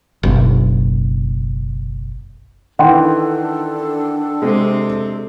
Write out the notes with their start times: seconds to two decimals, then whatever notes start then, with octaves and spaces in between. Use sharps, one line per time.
0.23 F#1 B1
2.79 D#3 E3 D4 A4 F#5 G5 C6
4.42 C3 G#3 C4